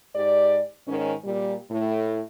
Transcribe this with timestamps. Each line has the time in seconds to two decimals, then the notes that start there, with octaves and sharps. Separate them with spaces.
0.15 G#2 G4 D5
0.87 G#2 D#3 C#4
1.25 A#2 G3
1.70 A2